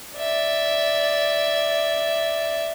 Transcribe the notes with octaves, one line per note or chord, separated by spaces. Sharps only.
D5 E5